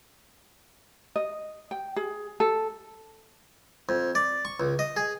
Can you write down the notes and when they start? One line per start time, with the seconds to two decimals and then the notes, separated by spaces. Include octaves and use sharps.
1.16 D#5
1.71 G5
1.96 G#4
2.40 A4
3.89 F2
4.15 D5
4.45 C#6
4.60 C#2
4.79 D#5
4.96 G#4